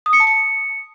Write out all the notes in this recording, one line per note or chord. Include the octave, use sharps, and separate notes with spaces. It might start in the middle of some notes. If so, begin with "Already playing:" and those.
D#6
C#7
A5
C#7